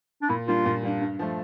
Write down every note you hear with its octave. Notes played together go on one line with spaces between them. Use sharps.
D4
A#2 E4
G3 A#3 D4 F4
A#2
G3 A#3 D4
G2
F3 A3